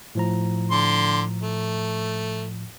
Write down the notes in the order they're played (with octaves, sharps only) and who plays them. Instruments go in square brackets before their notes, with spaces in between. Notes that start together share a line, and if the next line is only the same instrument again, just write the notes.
[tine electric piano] A2 F3 A#5
[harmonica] D3 C6
A3